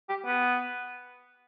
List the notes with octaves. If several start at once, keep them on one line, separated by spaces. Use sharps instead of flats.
G4
B3